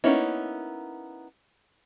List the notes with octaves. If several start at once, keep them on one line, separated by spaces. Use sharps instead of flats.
A#3 B3 C#4 D#4 E4